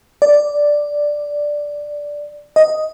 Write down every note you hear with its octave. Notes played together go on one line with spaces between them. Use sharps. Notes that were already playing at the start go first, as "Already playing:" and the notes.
D5
D#5